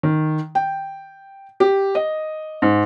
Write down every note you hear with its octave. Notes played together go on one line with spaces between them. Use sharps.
D#3
G5
G4
D#5
G#2